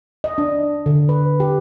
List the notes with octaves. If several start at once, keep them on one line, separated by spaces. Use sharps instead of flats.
D#5
D4
D3
B4
G4